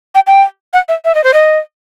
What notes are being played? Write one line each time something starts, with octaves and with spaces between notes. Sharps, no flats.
G5
G5
F#5
E5
E5
D#5
C5
D#5